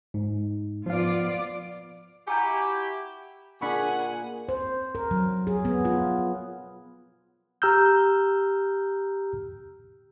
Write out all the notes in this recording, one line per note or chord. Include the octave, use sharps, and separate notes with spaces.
G#2
F3 B3 F4 D5 F5
E4 F#4 G4 G#5 A#5 G6
A#2 D4 G#4 F#5 B5 C#6
C5
A#4
F#3
G#4
B3
F4
G4 A#5 E6 F6 G6